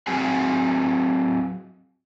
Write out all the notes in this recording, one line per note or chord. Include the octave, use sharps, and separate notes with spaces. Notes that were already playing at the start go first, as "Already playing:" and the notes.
F#3 C4 F#4 G#4 G#5